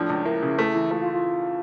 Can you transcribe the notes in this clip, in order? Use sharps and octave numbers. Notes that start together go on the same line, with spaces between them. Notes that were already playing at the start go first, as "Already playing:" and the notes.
Already playing: A2 F3 D4
C#2
A#3 E4
C#3
A3
E3
A3 F4
F4
F4